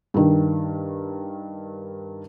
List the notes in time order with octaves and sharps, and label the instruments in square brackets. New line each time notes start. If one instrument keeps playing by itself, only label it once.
[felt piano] G2 D#3